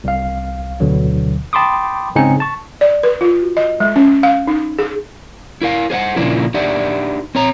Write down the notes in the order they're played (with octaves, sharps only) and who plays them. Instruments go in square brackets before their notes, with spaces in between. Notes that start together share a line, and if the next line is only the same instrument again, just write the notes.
[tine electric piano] C2 F5
D2 B2 D3 F#3
G5 A5 B5 C6 D6 D#6
G#2 C#3 C4 D#4 G#5 C#7
A5 C#6
[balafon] D5
B4
F4
F#4
D#5
G#3
C#4
F5
D#4
G#4
[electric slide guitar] E4 A#4 F5
G#4 C5 F5 F#5
A#2 C#3 F3 A#3 D4 E4
D4 D#4 G4 D5 E5 F#5
C4 C#5 A#5